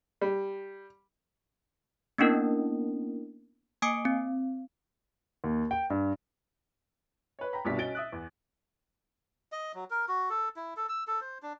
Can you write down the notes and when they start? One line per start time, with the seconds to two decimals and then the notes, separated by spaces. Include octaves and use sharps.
0.21 G3
2.18 A#3 B3 C#4 D4 E4 A#4
3.82 A#3 G#5 D6 D#6 C7 D7
4.05 C4
5.44 D#2
5.71 G5
5.90 G2
7.39 B4 C#5
7.53 G5 A#5 B5
7.65 C2 G2 B2 G3 D4 B6
7.77 C#4 F#4 D#5 A6 D7 G7
7.95 E5 D#6 F#6
8.12 E2
9.52 D#5
9.75 F#3
9.90 A#4
10.08 F#4
10.30 A4
10.56 E4
10.77 A4
10.89 E6
11.07 A4
11.21 C5
11.43 D4